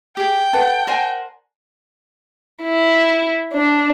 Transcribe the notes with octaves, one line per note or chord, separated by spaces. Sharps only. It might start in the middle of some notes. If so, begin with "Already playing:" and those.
G4 G#4 G5
A4 B4 F#5 A5
A#4 C5 D5 F#5 G#5 A5
E4
D4